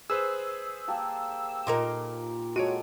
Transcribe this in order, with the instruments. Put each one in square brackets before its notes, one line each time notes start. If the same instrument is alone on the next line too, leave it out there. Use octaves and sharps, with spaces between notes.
[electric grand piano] G#4 B4 C5 [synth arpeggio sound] E6
[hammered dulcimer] A#3 G4 A5
[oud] A#2 D#4 A#4 [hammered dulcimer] C6 D6
[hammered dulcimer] G#3 A4 [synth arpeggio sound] F#4 [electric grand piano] C#5 D7 D#7